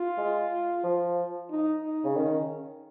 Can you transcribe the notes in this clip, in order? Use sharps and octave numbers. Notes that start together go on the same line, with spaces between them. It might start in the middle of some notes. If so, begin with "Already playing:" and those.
Already playing: F4
G#3
F3
D#4
D#4
C#3
D#3 C#4